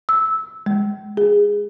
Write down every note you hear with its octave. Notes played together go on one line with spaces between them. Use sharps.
E6
G#3
G#4